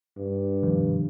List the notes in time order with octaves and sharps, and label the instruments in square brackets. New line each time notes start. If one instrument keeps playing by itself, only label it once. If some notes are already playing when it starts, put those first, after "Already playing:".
[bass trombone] G2
[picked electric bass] B2 D#3 F3